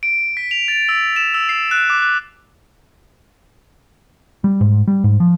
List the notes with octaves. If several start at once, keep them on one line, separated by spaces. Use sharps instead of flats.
D7
B6
F7
A6
E6
E7
E6
C7
F#6
D6
F#6
G3
G#2
G3
G#2
F3